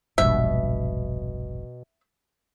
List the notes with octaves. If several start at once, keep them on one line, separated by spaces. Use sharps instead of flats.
E1 A#1 G2 B2 E5